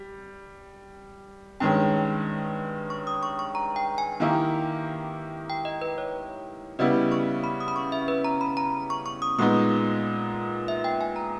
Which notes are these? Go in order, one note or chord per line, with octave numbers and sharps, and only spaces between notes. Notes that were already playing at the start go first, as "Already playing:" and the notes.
Already playing: G3
G2 D#3 G#3 C#4 G5
C#6
D#6
C#6
C#6
A#5
G5
G#5
D#3 A#3 E4 G4
G5
D#5
B4
C#5
C#3 G3 B3 E4 D#5
C#6
B5
D#6
B5
C#6
E5
B4
A#5
B5
A#5
C#6
C#6
D#6
A#2 G#3 B3 D#4 D#6
E5
G5
G#5
A#5